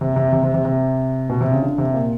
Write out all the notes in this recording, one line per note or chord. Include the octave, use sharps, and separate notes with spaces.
C3
C3
C3
C3
C3
C3
B2
C3
C#3
D3
C3
A#2